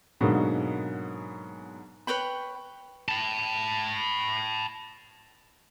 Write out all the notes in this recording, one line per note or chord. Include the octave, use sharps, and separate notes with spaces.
G#2 B2 D3 F#3 G#3 A#3
B4 C#5 G5 B5
A5 B5